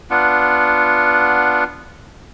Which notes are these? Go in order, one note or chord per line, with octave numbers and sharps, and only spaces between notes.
B3 D4 F4 F#5